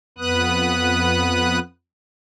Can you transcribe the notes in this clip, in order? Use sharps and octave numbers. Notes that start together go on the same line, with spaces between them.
F2 B3 B4 D#6 F#6